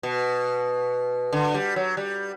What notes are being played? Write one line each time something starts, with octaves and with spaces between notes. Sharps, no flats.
B2
D3
G3
F#3
G3